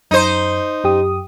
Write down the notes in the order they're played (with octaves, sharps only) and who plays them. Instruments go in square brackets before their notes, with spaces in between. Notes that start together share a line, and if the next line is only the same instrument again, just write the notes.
[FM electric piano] F#2 [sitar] D#4 C5
[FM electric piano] F#2 G4 D#6